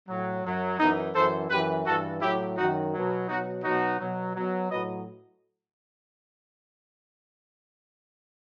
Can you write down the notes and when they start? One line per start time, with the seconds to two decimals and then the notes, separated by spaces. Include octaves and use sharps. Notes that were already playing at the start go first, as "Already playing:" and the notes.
0.08 A2 F#3
0.44 F#2 F#3
0.79 F#2 E3 B3 D#4
1.15 F#2 E3 A4 C5
1.50 F#2 E3 G4 B4
1.86 G2 E3 F#4 A4
2.22 A2 F#3 E4 G4
2.57 F#2 D#3 F#3 D#4 F#4
2.93 B2 F#3
3.28 B2 F#3 D#4 F#4
3.64 B2 F#3 D#4 F#4
4.00 B2 F#3
4.35 B2 F#3
4.71 A2 F#3 B4 D#5